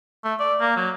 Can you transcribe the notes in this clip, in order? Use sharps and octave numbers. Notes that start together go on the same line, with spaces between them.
A3
D5
A#3
F#3